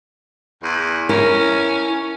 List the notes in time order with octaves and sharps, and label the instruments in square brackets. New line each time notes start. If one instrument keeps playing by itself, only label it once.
[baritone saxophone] E2
[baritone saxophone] C#4 [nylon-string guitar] E4 A#4